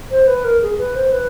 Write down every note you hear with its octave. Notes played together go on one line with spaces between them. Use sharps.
C5
B4
A#4
G#4
B4
C5
B4